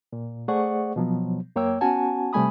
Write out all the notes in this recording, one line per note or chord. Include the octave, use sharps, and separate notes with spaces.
A#2
A3 G#4 C5 D5 F#5 C#6
B2 F3 F#3 B3
F#2 A#3 C#5 G5 E6
B3 C#4 F#4 F#5 G#5 A5
C3 G3 A3 G#5 B5 D#6